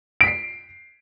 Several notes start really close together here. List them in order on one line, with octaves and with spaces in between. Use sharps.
D7 B6 C7